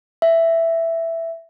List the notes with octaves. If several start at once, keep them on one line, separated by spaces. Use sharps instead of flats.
E5